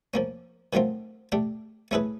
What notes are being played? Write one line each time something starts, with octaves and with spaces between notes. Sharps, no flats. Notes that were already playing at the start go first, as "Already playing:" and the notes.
F3 A#3 C#4
D#3 F#3 A3 C4 F4
A3 D4 G4
A3 C#4 E4 G#4 B4